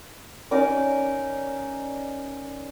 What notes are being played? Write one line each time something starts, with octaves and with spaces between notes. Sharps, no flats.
C#4 D#4 A#4 D5